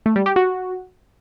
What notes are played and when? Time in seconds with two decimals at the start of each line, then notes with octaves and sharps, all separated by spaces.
0.06 A3
0.16 G3
0.26 G4
0.36 F#4